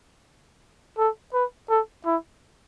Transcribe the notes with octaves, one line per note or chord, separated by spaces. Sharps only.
A4
B4
A4
E4